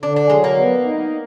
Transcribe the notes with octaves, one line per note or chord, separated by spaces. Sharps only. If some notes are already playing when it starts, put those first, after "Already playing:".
D3 D4
D4
F#3 G#3
A#3
B3
D#4